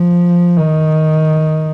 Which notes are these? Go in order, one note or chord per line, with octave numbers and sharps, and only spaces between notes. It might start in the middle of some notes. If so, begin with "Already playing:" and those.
Already playing: F3
D#3